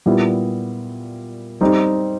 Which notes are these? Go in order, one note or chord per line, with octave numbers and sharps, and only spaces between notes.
A#2 G3 B3 E4
G3 C4 D#4